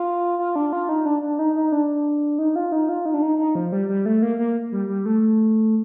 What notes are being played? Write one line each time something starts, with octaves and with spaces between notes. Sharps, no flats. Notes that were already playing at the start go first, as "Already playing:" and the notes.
Already playing: F4
F4
D4
F4
D#4
D4
D4
D#4
D#4
D4
D#4
F4
D#4
F4
D#4
D4
D#4
D#4
F3
G3
G3
A3
A#3
A#3
G3
G3
A3